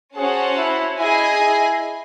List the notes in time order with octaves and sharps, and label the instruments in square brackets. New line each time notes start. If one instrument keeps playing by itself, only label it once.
[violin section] C#4 F#4 C5 F#5 A5 [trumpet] G#4
[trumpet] E4
[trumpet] E4 [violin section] G#4 D#5 G#5
[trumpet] E4